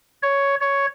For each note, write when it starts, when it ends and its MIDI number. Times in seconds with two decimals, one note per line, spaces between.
0.23 0.55 73
0.61 0.86 73